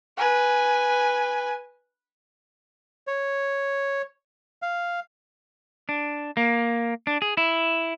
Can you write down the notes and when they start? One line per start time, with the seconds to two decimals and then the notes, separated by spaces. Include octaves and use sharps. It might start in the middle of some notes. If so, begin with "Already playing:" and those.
0.17 B4 G#5
3.07 C#5
4.62 F5
5.89 D4
6.37 A#3
7.07 D4
7.22 G#4
7.37 E4